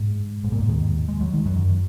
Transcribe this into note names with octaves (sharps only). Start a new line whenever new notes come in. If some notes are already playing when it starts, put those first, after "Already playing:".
Already playing: G#2 G#3
G#2 G#3
A#2 A#3
G#2 G#3
D#2 D#3
G#3
F#3
D#3
F#2 F#3